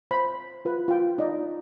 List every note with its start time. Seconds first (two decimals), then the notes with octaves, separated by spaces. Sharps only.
0.11 C5 B5
0.65 F4 B4
0.88 F4 G5
1.18 D#4 D5 D#5